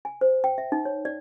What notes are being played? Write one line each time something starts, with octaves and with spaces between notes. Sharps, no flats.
G#5
C5
G5
E5
D#4
C#5
D5